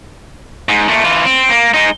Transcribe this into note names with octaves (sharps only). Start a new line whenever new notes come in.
G#2
A#2 A3
E3 F4
C4
A#3
G#3 D#4